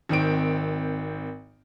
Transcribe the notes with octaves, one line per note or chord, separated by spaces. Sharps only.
G#1 D#3 C4 D7